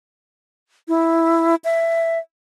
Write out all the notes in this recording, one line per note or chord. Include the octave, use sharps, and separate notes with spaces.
E4
E5